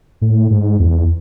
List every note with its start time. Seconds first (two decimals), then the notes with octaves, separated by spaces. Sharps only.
0.22 A2
0.51 G#2
0.80 E2